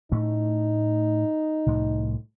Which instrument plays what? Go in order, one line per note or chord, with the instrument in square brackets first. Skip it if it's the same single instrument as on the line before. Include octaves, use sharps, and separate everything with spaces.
[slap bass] A2 A3 C#4 [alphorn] D#4
[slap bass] C2 A2 F3